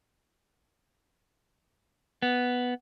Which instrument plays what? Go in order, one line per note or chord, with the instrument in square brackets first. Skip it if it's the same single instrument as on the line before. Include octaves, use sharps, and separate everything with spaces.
[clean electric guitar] B3